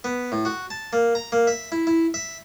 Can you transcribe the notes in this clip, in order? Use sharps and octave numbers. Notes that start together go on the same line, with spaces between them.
B3
A2
F#4
A5
A#3
A#5
A#3
E5
E4
E4
E5